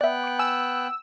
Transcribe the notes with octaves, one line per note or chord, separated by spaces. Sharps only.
B3 D5 E5 G5 F#6
D6 D7
G#5 E6